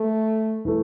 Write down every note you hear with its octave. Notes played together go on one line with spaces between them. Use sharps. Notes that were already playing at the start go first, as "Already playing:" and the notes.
Already playing: A3
E3 A3